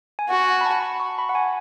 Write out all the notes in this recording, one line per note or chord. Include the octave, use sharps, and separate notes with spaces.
G#5
F#4 F#5
G#5
B5
A5
B5
C#6
B5
F#5
G#5